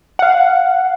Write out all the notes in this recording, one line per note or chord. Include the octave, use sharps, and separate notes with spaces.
F5 F#5